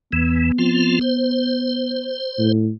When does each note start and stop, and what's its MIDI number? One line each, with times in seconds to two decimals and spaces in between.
0.12 0.52 40
0.12 0.52 52
0.12 2.17 59
0.58 0.99 53
0.58 0.99 60
0.58 0.99 65
1.01 2.52 72
2.39 2.70 45